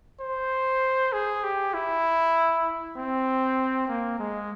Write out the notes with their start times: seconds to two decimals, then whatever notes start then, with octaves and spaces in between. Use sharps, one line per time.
0.21 C5
1.13 G#4
1.44 G4
1.74 E4
2.97 C4
3.88 A#3
4.19 G#3